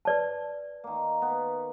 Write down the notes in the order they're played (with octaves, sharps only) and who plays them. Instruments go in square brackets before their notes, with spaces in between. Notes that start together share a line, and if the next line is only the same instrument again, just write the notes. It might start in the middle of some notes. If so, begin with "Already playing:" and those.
[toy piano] B4 D5 A5
[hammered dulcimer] D#3 A#3
B3